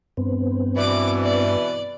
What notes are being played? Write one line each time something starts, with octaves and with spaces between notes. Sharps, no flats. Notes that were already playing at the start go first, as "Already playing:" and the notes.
G2 B3 C4
B2 E3 D5 D6
D5